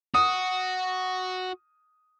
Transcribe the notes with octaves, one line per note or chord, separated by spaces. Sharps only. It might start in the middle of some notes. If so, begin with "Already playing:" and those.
F#4 D#6